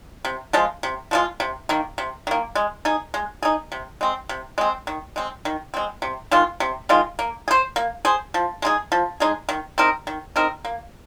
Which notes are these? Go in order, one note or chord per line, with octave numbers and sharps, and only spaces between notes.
C3
F3 G#3 F4
C3
F3 G#3 F4
C3
D#3 A#3
C3
D#3 A#3
G#3
D#4 G#4
G#3
D#4 G#4
C3
G#3 C4
C3
G#3 C4
D#3
G#3 C4
D#3
G#3 C4
C3
D#3 G#3 F4
C3
D#3 G#3 F4
A#3
G#4
C5
A#3
G#4 C5
F3
G#3 D#4 G#4
F3
G#3 D#4 G#4
D#3
C4 D#4 A#4
D#3
C4 D#4 A#4
A#3